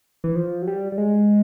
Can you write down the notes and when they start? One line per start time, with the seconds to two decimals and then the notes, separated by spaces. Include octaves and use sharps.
0.24 E3
0.36 F3
0.62 F#3
0.67 G3
0.92 G3
0.98 G#3